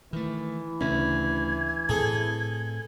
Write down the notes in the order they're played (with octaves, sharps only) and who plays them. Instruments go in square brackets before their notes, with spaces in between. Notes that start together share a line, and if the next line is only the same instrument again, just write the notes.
[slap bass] D#3 A3 [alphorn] E3
[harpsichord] D2 [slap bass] C#3 C#4 [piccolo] G#6
[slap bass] A2 C4 [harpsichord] G#4 A4